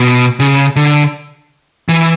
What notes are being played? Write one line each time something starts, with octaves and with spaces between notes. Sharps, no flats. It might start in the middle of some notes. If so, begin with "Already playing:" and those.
Already playing: B2
C#3
D3
E3